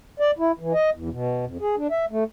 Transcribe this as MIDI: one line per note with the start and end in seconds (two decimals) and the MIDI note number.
0.20 0.31 74
0.38 0.52 64
0.59 0.73 52
0.74 0.90 75
0.94 1.09 40
1.11 1.45 47
1.45 1.58 41
1.61 1.75 68
1.77 1.87 62
1.91 2.05 76
2.11 2.24 57